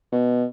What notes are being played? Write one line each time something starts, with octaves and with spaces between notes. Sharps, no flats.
B2